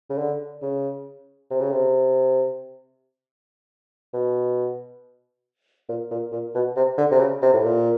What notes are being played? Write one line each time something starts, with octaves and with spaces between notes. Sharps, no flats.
C#3
D3
C#3
C3
C#3
C3
B2
A#2
A#2
A#2
B2
C3
D3
C3
C#3
C3
A2
A#2